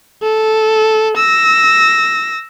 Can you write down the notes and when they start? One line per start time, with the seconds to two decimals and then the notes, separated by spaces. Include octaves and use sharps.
0.23 A4
1.17 E6 A#6